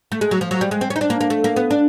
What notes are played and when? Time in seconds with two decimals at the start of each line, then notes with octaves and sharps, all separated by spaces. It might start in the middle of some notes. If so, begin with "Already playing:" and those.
0.12 A3
0.21 G#3
0.31 F#3
0.41 F3
0.51 F#3
0.61 G3
0.71 G#3
0.81 C4
0.90 C#4
0.96 D#4
1.01 D4
1.10 A#3
1.21 A#3
1.30 A3
1.44 A#3
1.56 B3
1.71 D4